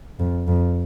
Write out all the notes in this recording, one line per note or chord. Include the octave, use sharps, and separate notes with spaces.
F2
F2